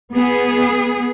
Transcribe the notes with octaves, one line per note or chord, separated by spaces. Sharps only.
B3 G#4